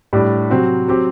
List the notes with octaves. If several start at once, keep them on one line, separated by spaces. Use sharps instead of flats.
A2 G3 D4
C3 F#3 C4 F#4
F#3 C4 G4